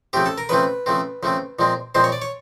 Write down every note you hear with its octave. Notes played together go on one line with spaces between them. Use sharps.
C#3 F3 A3 C4 G4
A4
A#4
C#3 F3 A3 C4 B4
C#3 F3 A3 C4
C#3 F3 A3 C4
A#2 F3 G#3 C4
A#2 F3 G#3 C4 C5
C#5
D5
C#5